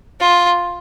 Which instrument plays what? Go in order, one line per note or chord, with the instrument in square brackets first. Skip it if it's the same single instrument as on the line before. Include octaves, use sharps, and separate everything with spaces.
[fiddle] F4